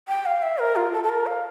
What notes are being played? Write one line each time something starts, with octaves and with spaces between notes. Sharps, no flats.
G5
F5
E5
A#4
F4
A4
A4
A#4
F5